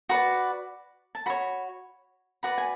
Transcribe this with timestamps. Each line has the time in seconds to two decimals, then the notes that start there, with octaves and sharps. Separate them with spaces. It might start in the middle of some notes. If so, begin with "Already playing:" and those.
0.09 F#4 B4 D5 C#6
1.15 A5
1.26 F#4 C#5 B5
2.43 F#4 B4 D5 B5
2.58 G#5